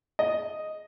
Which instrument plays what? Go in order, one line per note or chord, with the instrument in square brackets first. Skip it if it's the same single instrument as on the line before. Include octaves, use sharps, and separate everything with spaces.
[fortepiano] D#5